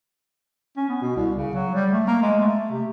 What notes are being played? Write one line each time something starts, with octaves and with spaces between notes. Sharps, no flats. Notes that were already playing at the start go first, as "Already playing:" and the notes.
C#4
B3
B2
C2
C#3
F#3
G3
A3
A#3
G#3
A3
C3